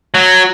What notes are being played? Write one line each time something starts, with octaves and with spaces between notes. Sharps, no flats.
F#3